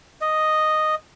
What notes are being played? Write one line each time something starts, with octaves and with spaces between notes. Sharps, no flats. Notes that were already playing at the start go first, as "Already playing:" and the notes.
D#5